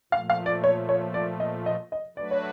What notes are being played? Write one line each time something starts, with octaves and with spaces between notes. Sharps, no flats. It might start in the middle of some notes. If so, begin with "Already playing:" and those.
A#2 F3 A3 F5
F5
D5
C#5
C#5
D5
D#5
D#5
D#5
F#3 A3 D4 F#4 B4 D5
C#5